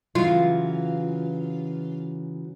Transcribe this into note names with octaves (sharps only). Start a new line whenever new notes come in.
C#3 E3 F#3 F4